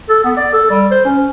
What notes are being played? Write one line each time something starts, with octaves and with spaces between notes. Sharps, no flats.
A4
B3
D5
A4
G3
C5
C#4